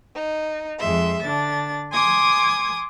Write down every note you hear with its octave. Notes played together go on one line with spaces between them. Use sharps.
D#4
F2 G#3 E5 C6
D3 D4 A6
G#5 C6 D6 D#6 G#6